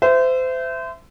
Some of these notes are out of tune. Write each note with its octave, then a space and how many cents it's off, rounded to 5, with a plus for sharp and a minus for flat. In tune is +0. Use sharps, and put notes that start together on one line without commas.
C5 -30 E5 +15